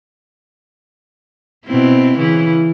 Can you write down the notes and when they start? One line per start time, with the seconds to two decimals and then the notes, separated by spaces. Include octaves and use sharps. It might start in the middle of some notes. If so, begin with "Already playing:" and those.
1.66 B2 C4 E4
2.17 C#3 E3 E4